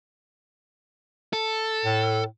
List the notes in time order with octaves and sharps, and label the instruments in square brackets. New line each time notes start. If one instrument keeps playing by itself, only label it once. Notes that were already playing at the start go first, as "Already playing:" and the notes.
[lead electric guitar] A4
[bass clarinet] A2